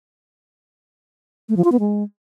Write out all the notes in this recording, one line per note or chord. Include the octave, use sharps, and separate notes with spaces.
A3
F3
F4
B3
G#3